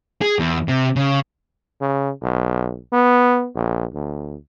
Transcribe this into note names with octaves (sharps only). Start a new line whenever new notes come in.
G#4
E2
C3
C#3
C#3
B1
B3
A#1
D2